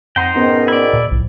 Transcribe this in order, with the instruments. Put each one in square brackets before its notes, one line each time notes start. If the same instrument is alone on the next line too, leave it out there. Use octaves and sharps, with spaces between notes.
[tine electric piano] F2 F#5 A#5 [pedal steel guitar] D#4 C5 G5
[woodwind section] G#2 B2 D#3 [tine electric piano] B3 C#4
[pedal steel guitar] E4 D5
[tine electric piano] D#2 [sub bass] A#2
[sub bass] B1 [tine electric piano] A2 F3